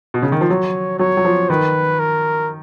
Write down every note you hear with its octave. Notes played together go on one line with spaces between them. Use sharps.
B2
C#3
D#3
F3
F#3 C#5
F#3 C#5
F#3
F3
D#3 B4
A#4